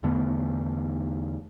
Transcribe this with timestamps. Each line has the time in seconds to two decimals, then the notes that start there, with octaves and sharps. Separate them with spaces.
0.03 E2 D3 A3 B3